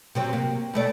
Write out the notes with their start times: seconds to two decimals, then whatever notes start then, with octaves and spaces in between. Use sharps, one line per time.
0.15 C3 F#3 C4
0.33 A#3
0.74 B2 A3 D5